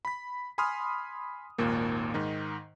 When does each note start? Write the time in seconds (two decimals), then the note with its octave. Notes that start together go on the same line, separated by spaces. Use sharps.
0.05 B5 B6
0.58 G#5 B5 C6 D#6 F6
1.58 G#1 D#2 A#2 A#3
2.14 G#2 D#3 D#4